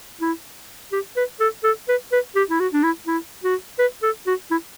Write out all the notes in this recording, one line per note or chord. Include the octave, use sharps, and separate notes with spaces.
E4
G4
B4
A4
A4
B4
B4
G4
E4
F#4
D4
E4
E4
F#4
B4
A4
F#4
E4